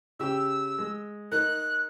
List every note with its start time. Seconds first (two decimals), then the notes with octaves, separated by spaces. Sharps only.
0.20 C#3 G4 E6
0.79 G#3
1.32 D#4 A#4 F#6